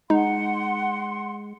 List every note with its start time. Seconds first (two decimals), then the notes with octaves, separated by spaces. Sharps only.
0.10 G#3 D#4 F#5 C6